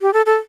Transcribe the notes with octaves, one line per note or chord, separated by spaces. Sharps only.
G4
A4
A4